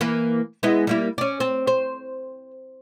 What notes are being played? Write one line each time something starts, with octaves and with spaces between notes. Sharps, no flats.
E3 A#3 B4
G#3 B3 E4
G3 A#3 E4
C#4 D5
C4
C5